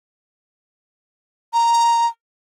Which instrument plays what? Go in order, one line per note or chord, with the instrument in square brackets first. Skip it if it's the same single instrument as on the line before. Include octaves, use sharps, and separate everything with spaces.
[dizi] A#5